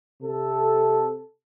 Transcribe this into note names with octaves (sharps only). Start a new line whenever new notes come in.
C3 A4